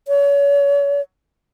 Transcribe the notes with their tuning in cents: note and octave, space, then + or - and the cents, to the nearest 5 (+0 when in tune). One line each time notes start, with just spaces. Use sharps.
C#5 +35